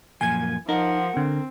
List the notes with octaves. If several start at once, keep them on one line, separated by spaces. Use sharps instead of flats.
F#2 A#2 F3 G#5 G#6
F3 D#4 A#4 F#5
D3 C4